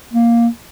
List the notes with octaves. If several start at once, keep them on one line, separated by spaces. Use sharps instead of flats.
A#3